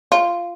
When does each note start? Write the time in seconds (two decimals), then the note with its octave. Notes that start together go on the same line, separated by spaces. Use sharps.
0.12 F4